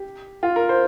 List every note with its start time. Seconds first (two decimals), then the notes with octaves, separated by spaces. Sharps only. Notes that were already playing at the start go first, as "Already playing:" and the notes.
Already playing: G4
0.43 F4
0.56 A#4
0.69 C5